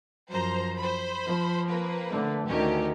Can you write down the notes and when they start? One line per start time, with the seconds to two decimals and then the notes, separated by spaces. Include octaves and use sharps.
0.30 F#2 F3 C5 A#5
0.77 C5 B5
1.26 F3
1.69 A#3 C4 B4
2.09 D3 A3
2.47 D2 D#3 C#4 G4